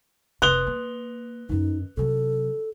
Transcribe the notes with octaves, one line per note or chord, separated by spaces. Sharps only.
F1 C3 B4 C6 D#6 F#6 F7 G7
A#3
F#2 D#3 D#4
C3 F#3 A4